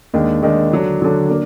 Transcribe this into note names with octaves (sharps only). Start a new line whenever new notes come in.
D#2 D#3 G#3 D4
D#2 D#3 G#3 D4
D3 F#3 D4
D3 F#3 D4
A#3 D4